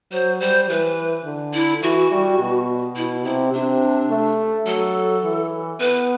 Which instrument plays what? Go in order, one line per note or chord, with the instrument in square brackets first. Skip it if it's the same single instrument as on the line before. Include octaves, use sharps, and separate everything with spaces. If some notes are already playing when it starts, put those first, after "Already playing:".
[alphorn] F#3 [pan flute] C5
[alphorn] G3 [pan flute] C5
[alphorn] E3 [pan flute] B4
[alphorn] D3
[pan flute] E4
[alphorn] E3 [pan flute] F#4
[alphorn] G3
B2
[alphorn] B2 [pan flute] E4
[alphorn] C3 [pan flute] E4
[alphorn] C3 [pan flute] D4
[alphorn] A3
[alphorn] F#3 [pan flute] A4
[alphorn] E3
[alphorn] B3 [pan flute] B4